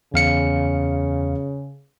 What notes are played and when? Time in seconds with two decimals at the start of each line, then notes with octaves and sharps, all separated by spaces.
0.14 E2 C#3 F5 C#7